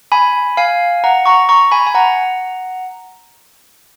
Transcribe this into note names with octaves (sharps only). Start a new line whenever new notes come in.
G#5 B5
F5 G#5
F#5 A#5
A#5 C#6
A#5 C#6
G#5 B5
G#5
F#5 A#5